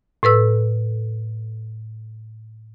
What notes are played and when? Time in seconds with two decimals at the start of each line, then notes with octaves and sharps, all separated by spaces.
0.23 A2 A4 B4 E6